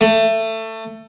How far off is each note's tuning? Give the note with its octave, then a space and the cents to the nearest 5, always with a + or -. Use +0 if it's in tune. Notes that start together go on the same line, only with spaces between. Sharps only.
A3 +20